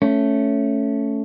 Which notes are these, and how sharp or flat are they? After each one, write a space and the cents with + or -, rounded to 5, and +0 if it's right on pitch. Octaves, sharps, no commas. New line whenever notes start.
A3 +0 C#4 +0